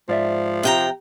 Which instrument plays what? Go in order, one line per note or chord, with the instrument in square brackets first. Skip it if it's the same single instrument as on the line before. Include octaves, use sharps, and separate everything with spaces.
[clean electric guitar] G#2 D5 E5 [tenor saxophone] F3
[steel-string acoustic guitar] C3 G5 A#5